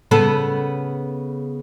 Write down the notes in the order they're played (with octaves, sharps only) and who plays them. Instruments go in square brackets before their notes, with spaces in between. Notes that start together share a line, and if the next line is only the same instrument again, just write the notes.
[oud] C#3 B3 A4